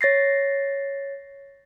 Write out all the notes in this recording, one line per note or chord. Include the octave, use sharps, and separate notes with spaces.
C#5 A6 A#6 C7